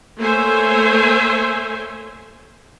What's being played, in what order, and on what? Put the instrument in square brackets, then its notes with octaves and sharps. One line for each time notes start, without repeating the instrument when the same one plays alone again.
[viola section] A3 A#3 C5 C#5 E5 G#5